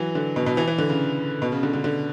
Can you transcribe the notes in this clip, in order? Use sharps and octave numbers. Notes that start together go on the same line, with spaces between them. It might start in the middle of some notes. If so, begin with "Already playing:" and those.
Already playing: E3 F#3
D3
B2
B2
E3
E3
D3
C#3
B2
C#3
D3
D3
D3